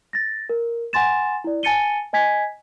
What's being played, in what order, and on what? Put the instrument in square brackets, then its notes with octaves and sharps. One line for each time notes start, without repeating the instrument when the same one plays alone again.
[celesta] A6 A#6
A#4
F#5 G#5 C6 A6 E7
E4 D5
G#5 A5 A6 C#7 D#7 G7
D#5 G#5 G#6 B6